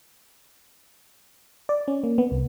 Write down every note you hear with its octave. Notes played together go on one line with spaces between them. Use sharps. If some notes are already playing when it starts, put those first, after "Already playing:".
D5
C#4
A#3
B3
C2